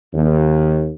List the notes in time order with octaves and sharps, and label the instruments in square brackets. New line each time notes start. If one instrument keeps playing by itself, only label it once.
[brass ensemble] D#2